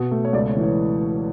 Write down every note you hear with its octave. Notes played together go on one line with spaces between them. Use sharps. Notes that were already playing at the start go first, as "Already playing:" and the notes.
Already playing: B2
A3
C#5
C#2 D5
C#5
E3
C#5